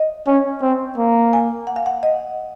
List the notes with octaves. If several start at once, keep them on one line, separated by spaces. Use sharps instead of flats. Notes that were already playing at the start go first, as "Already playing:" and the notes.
Already playing: D#5
C#4
C4
A#3
G#5
F#5
F5
F#5
D#5